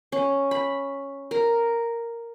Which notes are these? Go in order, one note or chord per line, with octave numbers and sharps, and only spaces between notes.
C#4
B5
A#4